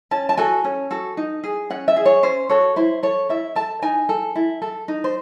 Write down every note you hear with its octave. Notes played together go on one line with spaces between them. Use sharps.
C#4 A5
A5
F#4 A4 G#5
C#4
F#4 A4
D#4
G#4
C#4 F#5
E5
G#4
C#5
C#4 C5
F#4 A4 C#5
E4 C5
A4 C#5
E4 E5
A4 A5
D#4 G#5
A4
E4
A4
D#4
C5